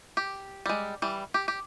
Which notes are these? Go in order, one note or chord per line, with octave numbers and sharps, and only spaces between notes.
G4
G3 G#3
E3 G3
G4
G4